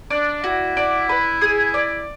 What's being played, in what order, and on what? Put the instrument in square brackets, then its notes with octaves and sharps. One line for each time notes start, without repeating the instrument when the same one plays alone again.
[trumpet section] D4 [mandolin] D5
[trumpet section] E4 [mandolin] F#4
[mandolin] D5
B4
G#4
D5